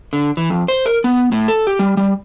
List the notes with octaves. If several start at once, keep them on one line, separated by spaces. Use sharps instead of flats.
D3
E3
F2
C5
A#4
B3
A2
A4
G4
G3
G3